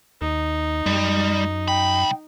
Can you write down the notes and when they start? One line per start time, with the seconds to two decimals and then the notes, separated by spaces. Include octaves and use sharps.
0.21 D#2 D#4
0.86 F#2 G3
1.68 C2 G5 B5